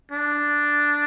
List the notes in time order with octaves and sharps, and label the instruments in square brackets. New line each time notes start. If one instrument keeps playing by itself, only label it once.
[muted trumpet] D4